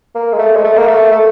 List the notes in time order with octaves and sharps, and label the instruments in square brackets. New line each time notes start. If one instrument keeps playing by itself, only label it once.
[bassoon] A#3
G#3
A3
G#3
A3
A#3
A3
A3